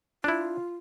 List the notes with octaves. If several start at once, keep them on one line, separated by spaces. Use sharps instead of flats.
D4 E4 F4